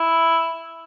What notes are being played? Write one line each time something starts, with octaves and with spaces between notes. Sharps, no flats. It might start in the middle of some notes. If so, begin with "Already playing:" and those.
Already playing: E4